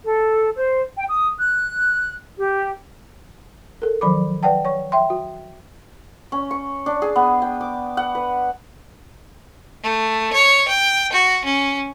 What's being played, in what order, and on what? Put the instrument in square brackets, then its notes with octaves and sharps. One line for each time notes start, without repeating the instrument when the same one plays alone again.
[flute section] A4
C5
G5
D#6
F#6
G4
[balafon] A4 A#4
D#3 F3 F#3 B5 D6
B4 D5 F#5 G5 A5
C#5 C#6
E5 G5 C6
F#4
[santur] C#4
C#6
D4
G#4
B3
G5
D6
F#5
B4
[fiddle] A3
C#5
G5
F#4
C#4